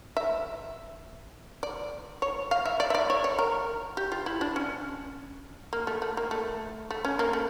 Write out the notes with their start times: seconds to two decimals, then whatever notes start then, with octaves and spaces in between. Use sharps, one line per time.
0.17 E5
1.63 D5
2.22 C#5
2.51 F5
2.65 E5
2.80 D5
2.90 E5
2.95 D5
3.10 C#5
3.24 C#5
3.39 A#4
3.97 G4
4.12 F4
4.26 E4
4.41 D4
4.56 C#4
5.73 A#3
5.87 A3
6.02 A3
6.17 A#3
6.31 A3
6.91 A3
7.05 C#4
7.19 A#3
7.33 A3